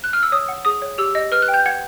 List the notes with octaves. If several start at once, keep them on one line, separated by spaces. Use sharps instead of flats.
F#6
F6
E6
C#5 D#6
F#5
G#4 D#6
C#5
G4 E6
D#5
B4 F6
F#6
G5
G6
F#5 G#6